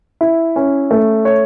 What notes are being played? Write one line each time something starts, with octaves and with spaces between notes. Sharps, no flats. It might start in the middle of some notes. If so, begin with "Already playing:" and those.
E4
C#4
A3
C#5